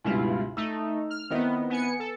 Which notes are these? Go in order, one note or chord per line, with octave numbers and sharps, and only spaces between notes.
C#2 G2 B2 E4 F4
A3 D#4 E6
F6
D#3 B3 C4 E4 D#5
B3 G#5 C#7
A4